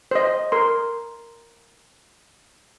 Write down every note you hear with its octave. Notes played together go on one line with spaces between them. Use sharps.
C5 D#5
A#4 C6